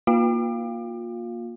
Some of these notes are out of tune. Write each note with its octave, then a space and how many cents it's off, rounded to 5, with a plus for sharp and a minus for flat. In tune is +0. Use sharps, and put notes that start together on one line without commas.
A#3 +10 F4 +30 F5 +0